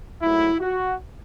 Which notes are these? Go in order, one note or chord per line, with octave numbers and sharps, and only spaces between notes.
G#2 F#3 A3 E4
F#4